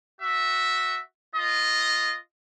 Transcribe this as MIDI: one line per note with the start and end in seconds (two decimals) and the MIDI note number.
0.21 1.01 66
0.21 1.01 76
1.35 2.16 65
1.35 2.16 75